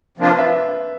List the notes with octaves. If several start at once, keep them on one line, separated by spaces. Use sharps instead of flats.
C3 F3 A#3 D4 F4
B4
E5